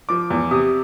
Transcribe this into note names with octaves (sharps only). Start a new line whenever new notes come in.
F3 D6
E2
C3 D#6